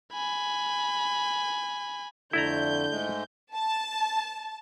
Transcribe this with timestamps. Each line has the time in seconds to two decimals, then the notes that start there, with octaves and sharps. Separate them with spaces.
0.13 G#5 B5
2.33 F2 D3 A3 E4 D5 A#5 G6
2.90 G#2 G#3 A3
3.55 A5